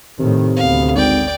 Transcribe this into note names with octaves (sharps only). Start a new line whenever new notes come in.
A2 C3 D#3
D2 B3 F5
G#1 D5 G5